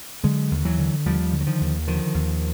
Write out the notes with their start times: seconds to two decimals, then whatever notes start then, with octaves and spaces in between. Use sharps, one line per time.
0.23 D3 F#3 G#3
0.51 D#2
0.65 E3 F#3
0.78 D3
1.06 D#2 F3 G3
1.33 D3
1.41 F#3
1.47 D#3 F3
1.61 D#2
1.87 D3 D#3 F3
2.14 D#2